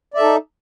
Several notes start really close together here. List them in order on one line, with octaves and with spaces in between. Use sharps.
D5 E5 A4 D#4